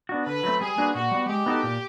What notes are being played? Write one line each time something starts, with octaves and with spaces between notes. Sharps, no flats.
B3 D4 F#4
D3 B4
F#3 A3 C4
G3 G#4
A#3 D4 F#4 B4
A#2 F#4
G3 B3
G#3 G4
B3 D#4 F#4 A4
A#2